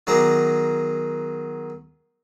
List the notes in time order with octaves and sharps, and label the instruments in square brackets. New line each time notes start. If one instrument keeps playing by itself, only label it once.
[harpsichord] D#3 F#3 B3 G#4 A#5 D6